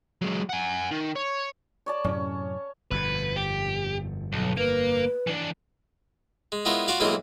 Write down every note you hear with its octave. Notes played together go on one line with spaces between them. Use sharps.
F#3 G#3
F#5 G#5
D#3
C#5
C#5 D5 A5
F#2 A2 C3 C#4
G1 F2 B2 B4
G4
B1 F#3
A#3 B4
E3 D4
G#3
G#3 B3 C#4 E4 F4 A#4
F4 F#4 D5 F5
B1 E3 G#3 A#3 F4 D#5